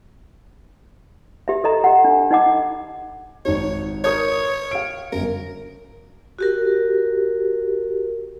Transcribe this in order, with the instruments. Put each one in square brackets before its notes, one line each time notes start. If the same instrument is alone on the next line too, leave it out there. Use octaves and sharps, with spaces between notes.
[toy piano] G4 E5
A4 D#5 A#5
G4 F#5
D4
D#4 D#5 F#5 D6
[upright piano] G#1 D#4 [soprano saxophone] C#5
[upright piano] A#4 D#6 G6 [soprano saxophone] C#5
[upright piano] F5 D7
[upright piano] G1 F#2 [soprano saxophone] A#4
[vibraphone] F#4 G4 A#4